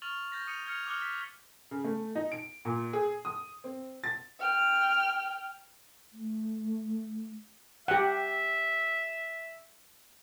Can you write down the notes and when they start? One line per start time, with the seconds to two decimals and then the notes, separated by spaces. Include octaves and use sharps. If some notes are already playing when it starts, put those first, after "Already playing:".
0.02 C#6 F6 A6 F7 F#7
0.32 G6 A6 A#6
0.47 D#6 C#7 D#7
0.66 F6 G#6 C#7 F7
0.86 D6 D#6 F6 F#6 C#7 G7
0.98 A6 B6
1.71 C#3
1.85 A3
2.15 D#4
2.32 D7
2.65 A#2
2.93 G#4
3.25 D#6
3.64 C4
4.04 A6
4.40 G5 F6
6.13 A3
7.88 G4 E5 F#5